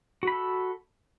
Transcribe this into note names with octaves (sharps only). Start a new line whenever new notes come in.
F#4 A4 B5